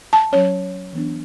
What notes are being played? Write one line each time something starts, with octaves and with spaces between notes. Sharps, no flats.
A5
F#3 C#4 C#5
E3 B3 D4